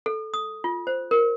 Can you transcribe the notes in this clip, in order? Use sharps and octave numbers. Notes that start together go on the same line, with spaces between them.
A4
D#6
F4
C5
A#4